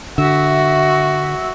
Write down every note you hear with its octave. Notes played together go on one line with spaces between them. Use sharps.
D3 F#4 E5